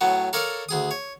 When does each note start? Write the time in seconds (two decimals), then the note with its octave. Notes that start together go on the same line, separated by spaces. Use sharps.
0.01 A2 F#3 B3
0.33 A4 A#4 C#5 D5 F5
0.69 D2 G#4 D#6
0.91 C#5